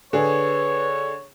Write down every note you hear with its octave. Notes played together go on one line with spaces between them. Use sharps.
D3 G#4 B4 C#5